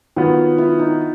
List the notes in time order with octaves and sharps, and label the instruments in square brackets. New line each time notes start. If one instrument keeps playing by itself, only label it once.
[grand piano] D#3 F#3 B3 [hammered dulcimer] F4
[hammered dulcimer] E4
D#4